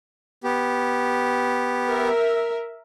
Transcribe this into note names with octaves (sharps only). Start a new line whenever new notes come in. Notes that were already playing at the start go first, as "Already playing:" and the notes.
B3 G4
A#4 E5